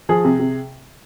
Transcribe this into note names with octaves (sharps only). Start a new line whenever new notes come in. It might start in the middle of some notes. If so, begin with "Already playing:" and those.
F3 G#4
C3
C3